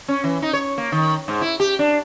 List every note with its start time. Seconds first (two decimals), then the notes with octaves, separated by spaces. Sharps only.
0.08 C#4
0.24 E3
0.42 D#4
0.53 C#5
0.78 A#3
0.92 D#3
1.28 G#2
1.41 E4
1.60 G4
1.79 D4